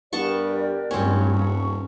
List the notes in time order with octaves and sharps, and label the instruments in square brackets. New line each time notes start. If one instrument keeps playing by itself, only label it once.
[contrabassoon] G2 [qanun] B3 A5 C#6 [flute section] G4 A#4 D5
[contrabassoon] D1 [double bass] G2 [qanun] C4 C#4
[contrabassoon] D#1 [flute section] C#6